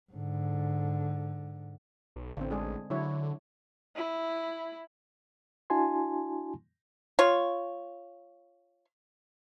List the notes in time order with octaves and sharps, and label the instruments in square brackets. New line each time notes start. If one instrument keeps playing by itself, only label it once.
[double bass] G#2 D3
[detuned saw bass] B1
[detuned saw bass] A1 [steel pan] D3 C4
[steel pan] G#3 D4 G#4
[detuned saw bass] D3 [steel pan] F#3 E4 C#5
[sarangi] E4
[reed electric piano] D4 E4 F#4 G#5 A5 C6
[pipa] F4 C#5